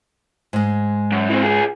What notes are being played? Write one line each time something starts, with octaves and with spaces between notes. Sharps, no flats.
G#2 G#3
F#2
E3 C4
F4 G#4